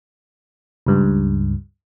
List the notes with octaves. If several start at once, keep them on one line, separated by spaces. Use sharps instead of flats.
C#2 G2